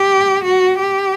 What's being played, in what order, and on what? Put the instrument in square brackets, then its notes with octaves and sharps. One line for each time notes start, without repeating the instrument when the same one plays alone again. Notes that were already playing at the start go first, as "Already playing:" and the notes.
Already playing: [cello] G4
F#4
G4